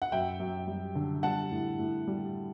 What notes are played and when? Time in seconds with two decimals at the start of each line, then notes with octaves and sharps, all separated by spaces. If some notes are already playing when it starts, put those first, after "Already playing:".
0.02 F#5
0.12 F#2 E5 G5
0.39 F#2
0.67 G3
0.95 D3
1.23 G3 F#5 A5
1.51 A2
1.79 A2
2.07 G3